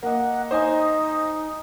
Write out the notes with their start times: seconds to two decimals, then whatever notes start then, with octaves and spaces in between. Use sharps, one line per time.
0.03 A#3 D#5 F#5
0.51 D#4 C5 D#5 G#5